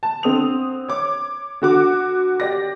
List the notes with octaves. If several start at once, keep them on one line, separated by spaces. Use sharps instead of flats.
A5
D3 C4 D#6 F7
C#5 D6
D3 F#4 D6
G4 D5 A#6